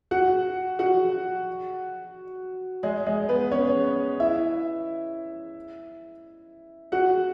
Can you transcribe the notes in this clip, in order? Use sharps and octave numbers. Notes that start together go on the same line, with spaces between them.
F#4 F#5
F#4 F#5
G#3 G#4
G#3 G#4
B3 B4
C#4 C#5
E4 E5
F#4 F#5